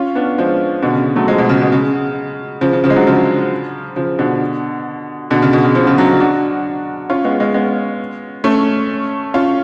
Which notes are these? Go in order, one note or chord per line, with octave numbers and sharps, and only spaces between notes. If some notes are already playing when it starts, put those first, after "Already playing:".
Already playing: C#4 F4
B3 D4
F3 G#3
B2 D3
C#3
F#3 A3
F3 G#3
B2
C#3
B2
C#3
C#3 F3
C#3
C#3 F3
G#3
D3 F#3
C#3 F3
C#3 F3
B2 D3
B2 D3
C#3
B2
C#3
C#3 F3
C#3 F3
D3 F#3
D4 F#4
C#4 F4
G#3 B3
G#3 B3
G#3 B3
A3 C#4
C#4 F4